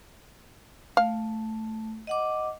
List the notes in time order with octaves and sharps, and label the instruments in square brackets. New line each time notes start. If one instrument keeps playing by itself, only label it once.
[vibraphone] A3 [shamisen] F5
[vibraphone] D#5 F#5 D6